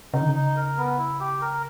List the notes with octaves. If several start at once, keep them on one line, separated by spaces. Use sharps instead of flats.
C#3 D#4
D#3
C#3
D#4
A#4
B3
E4
G4
A#4